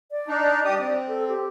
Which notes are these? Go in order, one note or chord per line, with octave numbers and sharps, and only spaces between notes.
D5
D4 D#4
G2 G4 D#6
C4
A4
G4